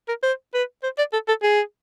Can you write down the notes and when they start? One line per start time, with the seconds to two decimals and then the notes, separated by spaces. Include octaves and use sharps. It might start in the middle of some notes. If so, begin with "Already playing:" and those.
0.08 A#4
0.23 C5
0.54 B4
0.84 C5
0.98 D5
1.13 A4
1.28 A4
1.43 G#4